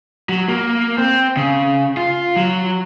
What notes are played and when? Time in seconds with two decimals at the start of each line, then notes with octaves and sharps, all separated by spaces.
0.29 F#3
0.48 A#3
0.98 C4
1.37 C#3
1.97 F4
2.37 F#3